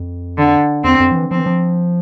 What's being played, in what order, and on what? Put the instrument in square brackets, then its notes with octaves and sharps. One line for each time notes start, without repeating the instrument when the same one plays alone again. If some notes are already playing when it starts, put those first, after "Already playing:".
Already playing: [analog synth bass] F2
[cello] D3
[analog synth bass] E2 [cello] C4
[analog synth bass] F2
F3
E3
[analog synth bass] F3 [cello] C4
[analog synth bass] E3
F3